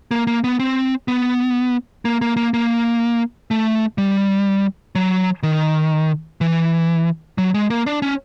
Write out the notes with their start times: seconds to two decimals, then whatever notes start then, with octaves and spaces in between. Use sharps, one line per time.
0.11 A#3
0.27 A#3
0.44 B3
0.59 C4
1.08 B3
2.05 A#3
2.22 A#3
2.37 A#3
2.54 A#3
3.51 A3
3.98 G3
4.95 F#3
5.43 D#3
6.41 E3
7.38 F#3
7.54 G#3
7.70 A#3
7.86 D4
8.02 C#4